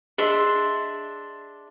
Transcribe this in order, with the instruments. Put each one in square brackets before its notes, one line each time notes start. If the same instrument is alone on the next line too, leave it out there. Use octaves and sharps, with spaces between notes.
[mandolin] D4 E5 C6 [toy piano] G#4 D#5